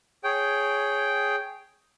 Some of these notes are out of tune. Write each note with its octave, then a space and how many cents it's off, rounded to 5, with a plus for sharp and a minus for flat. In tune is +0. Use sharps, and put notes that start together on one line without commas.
G#4 +5 C#5 +0 G5 -10